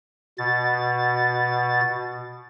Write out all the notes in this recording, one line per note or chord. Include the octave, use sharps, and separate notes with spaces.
B2 A6